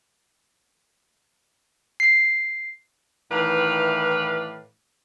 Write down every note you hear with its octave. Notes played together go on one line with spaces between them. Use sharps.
C7
A2 D#3 E3 B4 D5 F5